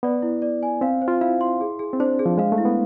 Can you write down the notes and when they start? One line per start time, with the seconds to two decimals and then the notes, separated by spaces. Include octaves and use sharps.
0.03 B3 D5
0.22 E4
0.42 D5
0.63 G#5
0.81 C4 F5
1.02 C5
1.08 F4
1.21 E4 F5
1.41 C6
1.61 G#4
1.79 G#4
1.93 C4
2.00 D4 C5
2.19 G#4
2.26 F3
2.38 G#3 F5
2.52 A3
2.58 E4
2.65 B3